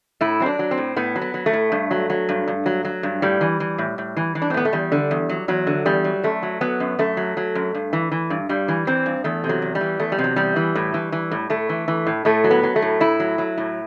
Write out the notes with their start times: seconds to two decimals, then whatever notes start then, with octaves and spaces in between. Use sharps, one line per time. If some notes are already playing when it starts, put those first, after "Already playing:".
0.21 A2 E4
0.40 F#3 C4
0.46 D4
0.59 F#3
0.71 C4
0.78 A2
0.96 A2 B3
1.16 F#3
1.21 B3
1.34 F#3
1.46 A3
1.53 A2
1.72 G2
1.91 F#3
2.10 F#3
2.29 G2
2.47 G2
2.66 F#3
2.85 F#3
3.03 G2
3.22 A2 G3
3.41 E3
3.60 E3
3.78 A2
3.98 A2
4.17 E3
4.35 E3
4.42 D4
4.50 C4
4.54 A2 B3
4.65 A3
4.73 E2 G3
4.92 D3
5.11 E2
5.29 F#3
5.48 E2 F#3
5.67 D3
5.86 E2 G3
6.04 F#3
6.23 F#2 A3
6.43 F#3
6.61 F#3 B3
6.80 F#2
6.99 F#2 A3
7.17 F#3
7.37 F#3
7.55 F#2
7.74 G2
7.93 E3
8.11 E3
8.30 G2
8.49 G2 G3
8.68 E3
8.87 E3 C4
9.06 G2
9.24 E2 A3
9.44 C3
9.49 F#3
9.62 E2
9.75 G3
9.81 E3
9.99 E2 A3
10.12 G3
10.19 C3
10.24 F#3
10.36 E2 G3
10.56 E3
10.75 A2
10.94 E3
11.12 E3
11.31 A2
11.50 A2 A3
11.69 E3
11.88 E3
12.07 A2
12.25 A2 A3
12.44 F#3
12.51 B3
12.63 F#3
12.76 A3
12.82 A2
13.00 A2 E4
13.20 F#3
13.38 F#3
13.58 A2